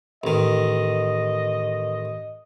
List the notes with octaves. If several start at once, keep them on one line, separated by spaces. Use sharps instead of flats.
A1 D#3 D#5